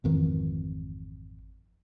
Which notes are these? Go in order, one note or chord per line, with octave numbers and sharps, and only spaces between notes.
G#1 F2 D#3 E3